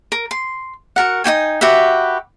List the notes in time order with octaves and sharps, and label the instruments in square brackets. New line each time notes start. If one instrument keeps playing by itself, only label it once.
[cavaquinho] A#4
C6
F#4 A#4 F#5
D#4 F#4 G5 G#5
F#4 G4 B4 E5